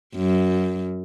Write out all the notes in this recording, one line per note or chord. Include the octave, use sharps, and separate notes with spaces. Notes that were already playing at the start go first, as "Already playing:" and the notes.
F#2